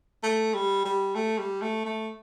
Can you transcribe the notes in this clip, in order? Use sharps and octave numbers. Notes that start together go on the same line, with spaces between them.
A3
G3
G3
A3
G3
A3
A3